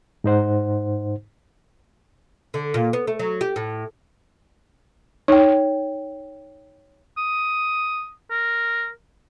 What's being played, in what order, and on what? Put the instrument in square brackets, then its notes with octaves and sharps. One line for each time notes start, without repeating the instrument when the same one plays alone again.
[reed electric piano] G#2 D#4 C5 F#5
[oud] D3
A#2
B3
A3
F#3
G4
A2
[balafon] D#4 [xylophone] C#5 G5
[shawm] D#6
A#4